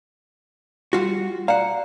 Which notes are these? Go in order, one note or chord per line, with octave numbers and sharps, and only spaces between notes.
G3 F4 F#4
D5 F5 F#5 A#5